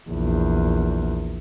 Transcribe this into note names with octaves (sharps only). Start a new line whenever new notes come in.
A#1 E2